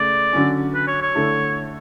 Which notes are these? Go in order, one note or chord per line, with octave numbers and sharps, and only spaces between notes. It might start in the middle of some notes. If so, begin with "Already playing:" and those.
Already playing: C#3 A3 D5
D3 F#3 C#4
B4
C#5
C#5
D3 A3 E4 A4